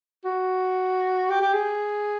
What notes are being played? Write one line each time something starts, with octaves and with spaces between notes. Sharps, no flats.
F#4
G4
G4
G#4